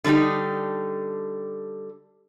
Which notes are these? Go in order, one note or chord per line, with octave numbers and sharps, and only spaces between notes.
D3 G3 D4 D#4 G4